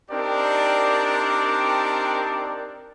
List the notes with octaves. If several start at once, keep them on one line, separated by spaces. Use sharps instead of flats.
C4 D4 D#4 G4 A#4 D5